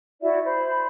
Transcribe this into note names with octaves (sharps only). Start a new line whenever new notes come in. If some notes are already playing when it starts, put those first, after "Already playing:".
E4 F#4 D5 E5
C5 B5